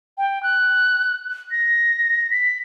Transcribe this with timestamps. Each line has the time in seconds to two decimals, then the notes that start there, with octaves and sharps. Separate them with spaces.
0.18 G5
0.43 F#6
1.51 A#6
2.31 B6